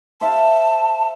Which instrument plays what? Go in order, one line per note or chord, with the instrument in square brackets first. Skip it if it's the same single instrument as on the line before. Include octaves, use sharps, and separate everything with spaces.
[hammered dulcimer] C5 E5 F5 [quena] A5